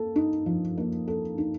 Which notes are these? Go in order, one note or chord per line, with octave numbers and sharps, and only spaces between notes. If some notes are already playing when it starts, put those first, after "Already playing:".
Already playing: A#3 A4
D#4
F3
A#3
A4
D#4